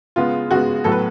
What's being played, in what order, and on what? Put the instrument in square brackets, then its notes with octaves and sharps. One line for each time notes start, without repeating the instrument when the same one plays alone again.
[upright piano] C#3 G#3 B3 F4
C#3 G#3 B3 F#4
A2 F#3 B3 A4
B4